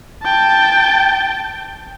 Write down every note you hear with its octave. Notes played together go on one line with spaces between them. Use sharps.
G5 A5